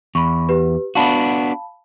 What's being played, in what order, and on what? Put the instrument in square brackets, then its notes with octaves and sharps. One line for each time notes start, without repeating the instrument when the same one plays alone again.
[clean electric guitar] E2 [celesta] B5 C#6
[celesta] G4 B4
[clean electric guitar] B3 D4 F#4 [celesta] F5 A5 B5